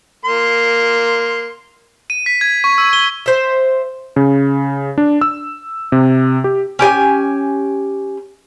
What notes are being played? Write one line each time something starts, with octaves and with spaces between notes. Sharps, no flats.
A#3 C6
D#7
B6
G#6
C#6
E6
G7
C5 E5
C#3
D4
E6
C3
G4
C#4 G4 G#5